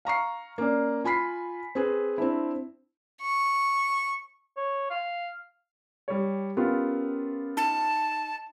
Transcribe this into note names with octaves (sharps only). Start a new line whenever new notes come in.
F5 A#5 C#6 C7
A#3 C#4 D5
F4 G#5 B5 B6 C7
C4 G#4 B4
C4 D4 E4
C#6
C#5
F5
G3 C#5
B3 C#4 F4 G4 A#4
D#4 A5